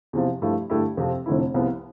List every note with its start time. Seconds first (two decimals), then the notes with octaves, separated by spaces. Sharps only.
0.13 E2 C3 F3
0.42 G2 F3 A3 E4 G4
0.70 G2 D3 A3 E4 G4
0.97 F2 C3 F3 C4
1.26 F1 F2 D3 A3 E4
1.54 C2 C3 F3 B3